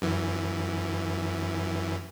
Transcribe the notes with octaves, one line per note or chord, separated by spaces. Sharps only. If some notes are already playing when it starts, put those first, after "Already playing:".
F#2 E3